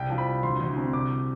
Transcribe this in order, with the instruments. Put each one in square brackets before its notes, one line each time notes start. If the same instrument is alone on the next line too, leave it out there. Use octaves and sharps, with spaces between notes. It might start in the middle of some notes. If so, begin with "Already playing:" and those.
Already playing: [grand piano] C2 G5
F3
B5
C2
D2 C6
D2
C3
C2 D6